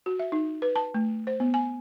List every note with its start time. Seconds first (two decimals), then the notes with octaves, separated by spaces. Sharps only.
0.06 F#4
0.19 E5
0.32 D#4
0.62 B4
0.76 A5
0.94 A3
1.27 C5
1.40 B3
1.54 G#5